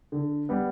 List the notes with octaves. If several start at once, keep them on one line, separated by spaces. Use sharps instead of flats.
D3
G3 B3